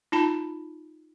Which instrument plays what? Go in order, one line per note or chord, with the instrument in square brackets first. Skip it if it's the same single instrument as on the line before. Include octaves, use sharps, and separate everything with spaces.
[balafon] D#4 F4 A5 B5